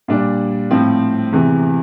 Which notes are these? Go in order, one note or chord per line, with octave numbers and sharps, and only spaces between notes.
A#2 G3 D4
A2 F3 C4
E2 C3 E3